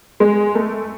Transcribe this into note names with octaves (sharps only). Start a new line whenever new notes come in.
G#3
A3